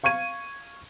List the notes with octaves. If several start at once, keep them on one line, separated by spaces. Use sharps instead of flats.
F5 C#6 G#6 D#7